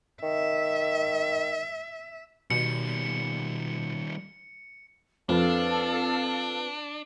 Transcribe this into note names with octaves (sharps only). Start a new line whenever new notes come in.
D#3 E5
B2 D#3 G3 C#7
F2 C4 D4 F4 A4 B4 F5 A5